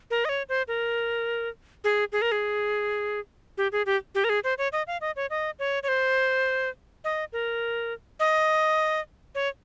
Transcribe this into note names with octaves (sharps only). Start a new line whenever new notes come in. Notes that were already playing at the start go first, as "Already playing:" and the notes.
A#4
D#5
C#5
C5
A#4
G#4
G#4
A#4
G#4
G4
G#4
G4
G4
A#4
G#4
C5
C#5
D#5
F5
D#5
C#5
D#5
C#5
C#5
C5
D#5
A#4
D#5
C#5